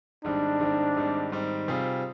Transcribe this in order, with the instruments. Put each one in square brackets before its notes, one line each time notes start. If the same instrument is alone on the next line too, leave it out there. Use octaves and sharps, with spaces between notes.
[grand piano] G#2 D#3 G3 C4 [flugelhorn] D4
[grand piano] G#2 D#3 G3 C4
G#2 D#3 G3 C4
G#2 D#3 G3 C4
C3 G3 C4 F4 G#4